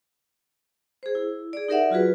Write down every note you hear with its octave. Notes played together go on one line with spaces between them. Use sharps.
G#4 C5
E4
G#4 D5
D#4 G4 A#4 D5 E5 F#5
F#3 F4 F#4 G#4 B4